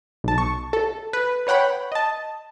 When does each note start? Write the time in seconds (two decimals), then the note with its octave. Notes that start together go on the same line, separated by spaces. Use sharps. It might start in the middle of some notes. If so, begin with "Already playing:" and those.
0.24 B1 A5
0.38 C#6
0.73 A4
1.13 B4
1.47 B4 C#5 F#5 G5 B5
1.92 D#5 A5